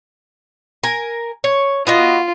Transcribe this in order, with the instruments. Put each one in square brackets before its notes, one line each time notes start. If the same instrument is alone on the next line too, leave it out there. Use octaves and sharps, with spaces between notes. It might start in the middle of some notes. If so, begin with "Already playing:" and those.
[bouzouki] A#4 G#5
C#5
[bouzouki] B3 F#4 D#5 [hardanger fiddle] F4